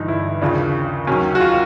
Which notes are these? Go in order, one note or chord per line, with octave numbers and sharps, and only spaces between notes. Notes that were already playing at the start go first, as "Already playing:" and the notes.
Already playing: G1 G2 E3 D4 D#4
E4
D#2 C#3 F3 D4
D#2 D#3 F#3 C#4
F#4
F4